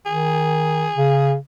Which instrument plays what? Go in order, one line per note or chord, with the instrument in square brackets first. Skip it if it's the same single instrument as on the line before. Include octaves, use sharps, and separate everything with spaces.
[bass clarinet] D#3 [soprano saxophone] G#4
[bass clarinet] C#3